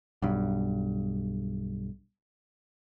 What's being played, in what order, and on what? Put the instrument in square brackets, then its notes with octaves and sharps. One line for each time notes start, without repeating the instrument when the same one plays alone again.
[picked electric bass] B1 G2